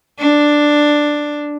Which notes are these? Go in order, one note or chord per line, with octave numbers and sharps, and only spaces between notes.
D4